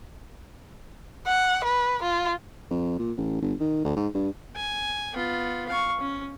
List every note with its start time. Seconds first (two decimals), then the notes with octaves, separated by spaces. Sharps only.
1.27 F#5
1.64 B4
2.03 F4
2.71 F2
2.99 A#2
3.17 A1
3.42 G1
3.60 D#3
3.85 D2
3.96 G#2
4.15 G2
4.56 G#5
5.14 B3 F4
5.68 F5 C#6
6.00 C#4